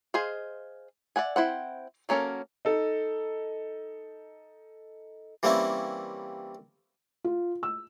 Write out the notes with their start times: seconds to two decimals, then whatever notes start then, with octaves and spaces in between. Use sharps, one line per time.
0.14 G#4 C5 D#5 F5
1.16 D5 E5 F#5 G#5
1.36 C4 E4 C5 F#5
2.09 F#3 A#3 C#4 A4 A#4
2.65 D#4 A4
5.43 E3 G3 A#3 C4 C#4 E4
7.24 F4
7.63 E6